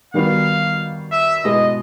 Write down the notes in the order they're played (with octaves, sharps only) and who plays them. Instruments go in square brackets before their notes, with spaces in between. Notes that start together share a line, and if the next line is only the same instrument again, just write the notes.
[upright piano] D#3 G3 B3 D#4 F#4 [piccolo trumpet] F5
[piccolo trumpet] E5
[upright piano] B2 G#3 B3 E4 G4 [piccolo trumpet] D#5